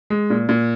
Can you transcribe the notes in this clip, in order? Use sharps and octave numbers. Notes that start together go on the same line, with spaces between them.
G#3
A#2
A#2